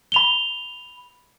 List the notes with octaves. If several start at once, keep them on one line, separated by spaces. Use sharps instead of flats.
B5 F7 G7